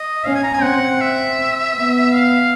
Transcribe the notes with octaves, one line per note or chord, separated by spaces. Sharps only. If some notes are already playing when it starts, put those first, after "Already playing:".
Already playing: D#5
C#4 F5
G#5
A#5
G#5
C4 F#5
E5
B3
F5